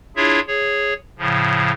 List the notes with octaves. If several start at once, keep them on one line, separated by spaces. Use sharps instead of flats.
D4 E4 F4 G#4 C#5 E5
G#4 C#5
A2 C#3 F3